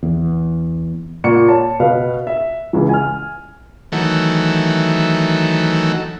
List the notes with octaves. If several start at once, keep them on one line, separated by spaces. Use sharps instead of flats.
E2
A#2 C#6 C#7
C#5 A5
B2 B4 F5
E5
C#2 E3
G#5 F6
D#3 E3 F#3 A3